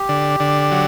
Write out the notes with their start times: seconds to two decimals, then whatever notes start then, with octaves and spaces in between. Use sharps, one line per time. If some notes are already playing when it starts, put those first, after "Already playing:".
Already playing: G4
0.09 D3
0.40 D3
0.72 F#3